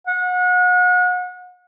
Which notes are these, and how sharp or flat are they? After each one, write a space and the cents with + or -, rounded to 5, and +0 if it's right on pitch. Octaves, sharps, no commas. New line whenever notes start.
F#5 -35